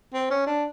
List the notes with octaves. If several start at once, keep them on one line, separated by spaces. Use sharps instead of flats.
C4
C#4
D4